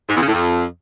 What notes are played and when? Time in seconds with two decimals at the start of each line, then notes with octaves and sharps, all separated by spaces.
0.09 G#2
0.15 E2
0.21 C#3
0.27 A2
0.33 F2